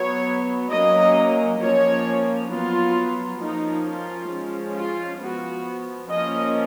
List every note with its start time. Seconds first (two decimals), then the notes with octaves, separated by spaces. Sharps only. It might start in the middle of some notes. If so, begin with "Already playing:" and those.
Already playing: F#3 B3 C#5
0.71 F#3 A#3 C#4 D#5
1.61 F3 A#3 C#4 C#5
2.51 F#3 B3 F4
3.41 F3 A#3 C#4 D#4
3.86 F4
4.31 F3 G#3 C#4
4.76 F4
5.21 F3 B3 F#4
6.10 F3 A#3 C#4 D#5